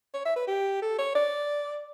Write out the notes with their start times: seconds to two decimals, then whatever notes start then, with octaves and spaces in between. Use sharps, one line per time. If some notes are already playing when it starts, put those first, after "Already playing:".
0.14 C#5
0.25 E5
0.36 B4
0.47 G4
0.82 A4
0.98 C#5
1.15 D5